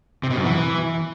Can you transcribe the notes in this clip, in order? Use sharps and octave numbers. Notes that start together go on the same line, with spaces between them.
C3
B2
F#2
E3